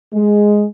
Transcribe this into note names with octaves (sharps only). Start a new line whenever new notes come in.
G#3